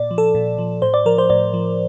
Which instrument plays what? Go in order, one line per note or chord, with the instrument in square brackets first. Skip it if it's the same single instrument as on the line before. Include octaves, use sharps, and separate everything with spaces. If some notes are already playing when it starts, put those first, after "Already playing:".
Already playing: [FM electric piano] A#2 D5
F3
A4
A#2
F3
A2 C5
D5
F3 A#4
C5
A2 D5
F3